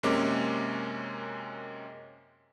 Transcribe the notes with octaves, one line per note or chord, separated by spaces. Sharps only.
F#2 C3 G#3 A#3 C#4 D6